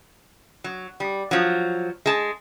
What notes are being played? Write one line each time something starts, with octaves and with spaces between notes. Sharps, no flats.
F#3
G3
F3 F#3
G#3 A5